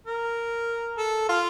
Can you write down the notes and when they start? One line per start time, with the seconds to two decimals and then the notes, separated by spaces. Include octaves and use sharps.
0.07 A#4
0.98 A4
1.29 F4